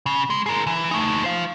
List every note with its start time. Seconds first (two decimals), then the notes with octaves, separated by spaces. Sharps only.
0.06 C#3
0.30 G#3
0.46 G#4 A#4
0.67 E3
0.91 A3 D#4
1.24 C5 F5